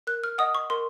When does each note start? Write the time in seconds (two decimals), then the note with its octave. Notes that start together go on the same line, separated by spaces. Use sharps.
0.07 A#4 F#6
0.24 F6
0.38 D#5 F#5 D#6
0.55 C#6
0.70 A#4 C6